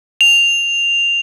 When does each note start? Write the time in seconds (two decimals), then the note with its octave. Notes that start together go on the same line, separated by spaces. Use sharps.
0.21 F7